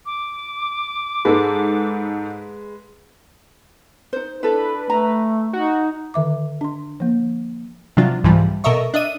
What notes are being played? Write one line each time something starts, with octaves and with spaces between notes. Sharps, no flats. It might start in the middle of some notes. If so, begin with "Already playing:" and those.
D6
G#2 G#3 A4 B4
D#4 C5
D4 E4 A4 B4
A3 A#5
D#4 F#4
D3 D#3 E5 D6
D4 C6
F3 A#3
C3 F3 F#3 D4 F4
C2 G#2 E3 F3 G3
B2 A4 A#4 D#5 E5 C#6
D4 D#5 E5 D#7